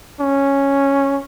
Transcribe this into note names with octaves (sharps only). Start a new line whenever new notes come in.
C#4